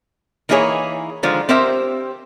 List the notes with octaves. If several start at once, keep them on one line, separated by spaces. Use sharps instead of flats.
E3 A#3 D#4 E4 G#4 C#5
D3 D#3 F3 G#3
C4 G4 A#4 C5 E5